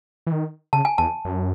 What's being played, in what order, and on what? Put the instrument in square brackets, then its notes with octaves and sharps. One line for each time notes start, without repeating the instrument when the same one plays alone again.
[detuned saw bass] E3
D#3
[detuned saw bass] C#3 [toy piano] A5
[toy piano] G#5
[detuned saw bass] E2 [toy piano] A5
[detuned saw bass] F#2